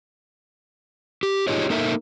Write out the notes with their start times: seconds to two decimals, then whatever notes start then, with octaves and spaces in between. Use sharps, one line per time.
1.23 G4
1.47 D#4 F4 G4 G#4 C#5 D#5
1.70 A#3 D#4 A4 A#4 E5